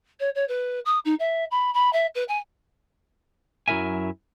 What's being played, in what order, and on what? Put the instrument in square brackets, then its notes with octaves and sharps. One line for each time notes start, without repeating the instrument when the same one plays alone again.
[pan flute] C#5
C#5
B4
D#6
D#4
E5
B5
B5
E5
B4
G#5
[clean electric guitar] F#2 F#3 E4 A#4 E5 G#5